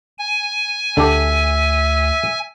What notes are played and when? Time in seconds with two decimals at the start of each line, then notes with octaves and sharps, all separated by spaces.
0.18 G#5
0.97 D2 D3 D4 G4 E5